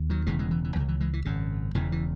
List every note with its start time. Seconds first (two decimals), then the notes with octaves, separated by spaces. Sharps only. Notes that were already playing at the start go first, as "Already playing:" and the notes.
Already playing: D#2
0.10 D#3 F#3
0.26 E1 E2 C#3 E3 G#3
0.39 E3 G#3
0.51 E3
0.64 E3
0.76 C#2 C#3 E3
0.88 E3
1.00 E3 G#3
1.13 E3
1.25 G#1 F#2 C#3
1.75 E1 E2 C#3 E3
1.92 E3